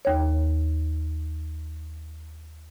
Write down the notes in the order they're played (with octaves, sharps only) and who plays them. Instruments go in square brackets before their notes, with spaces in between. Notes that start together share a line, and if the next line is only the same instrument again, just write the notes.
[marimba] D#2 C#5